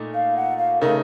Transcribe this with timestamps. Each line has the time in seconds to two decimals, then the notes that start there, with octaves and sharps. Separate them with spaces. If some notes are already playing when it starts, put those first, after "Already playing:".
Already playing: A#2 A3 D#4
0.14 F5
0.36 F#5
0.58 F5
0.80 C#3 A3 D#4 A#4